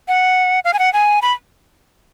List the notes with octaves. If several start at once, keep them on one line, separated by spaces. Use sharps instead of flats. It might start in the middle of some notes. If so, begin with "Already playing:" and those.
F#5
F5
G#5
F#5
G#5
B5